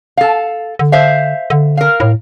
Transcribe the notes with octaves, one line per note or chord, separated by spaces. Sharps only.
A4 F5
D3
C5 E5 F5
D3
A#4 F5
A2